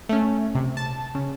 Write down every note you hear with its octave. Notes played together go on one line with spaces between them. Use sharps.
A3 C#4
C3
A5
C#3